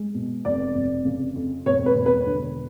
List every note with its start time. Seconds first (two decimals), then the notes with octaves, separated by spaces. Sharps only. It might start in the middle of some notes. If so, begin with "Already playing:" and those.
Already playing: G#3
0.14 B2
0.45 F1 D5
0.75 F1
1.05 C#3
1.35 F2
1.66 E1 C#5
1.86 B4
1.96 E1
2.06 B4
2.26 D3